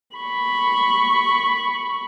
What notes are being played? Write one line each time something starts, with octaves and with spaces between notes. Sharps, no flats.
B5 C#6